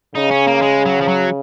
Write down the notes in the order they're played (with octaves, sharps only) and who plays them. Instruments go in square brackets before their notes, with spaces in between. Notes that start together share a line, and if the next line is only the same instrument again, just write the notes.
[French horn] C#3 [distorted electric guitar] D#4
[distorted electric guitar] C#4
A#3
G#3
F#3
F3
F#3